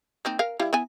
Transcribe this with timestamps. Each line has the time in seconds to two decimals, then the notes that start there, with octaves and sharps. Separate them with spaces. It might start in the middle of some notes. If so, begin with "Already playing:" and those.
0.25 A#3 C4 D#4
0.39 A#4 F5
0.59 G3 E4 F5
0.73 B3 E4 G#5